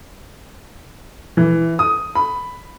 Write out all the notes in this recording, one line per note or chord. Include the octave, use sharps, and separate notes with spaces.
E3
D#6
B5